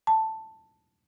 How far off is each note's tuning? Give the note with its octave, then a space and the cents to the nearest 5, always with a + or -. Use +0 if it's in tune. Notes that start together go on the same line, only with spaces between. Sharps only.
A5 +5